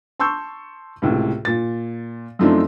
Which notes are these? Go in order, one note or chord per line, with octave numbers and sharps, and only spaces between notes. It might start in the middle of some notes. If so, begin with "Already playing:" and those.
A5 C6 C#6 E6 G6
C#2 A2 C3
A#2 A6
F#2 F3 A3 C4 D4 D#4